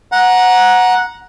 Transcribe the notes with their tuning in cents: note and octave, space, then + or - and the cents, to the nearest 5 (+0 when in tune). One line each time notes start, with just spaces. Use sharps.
F#5 -10 A#5 +15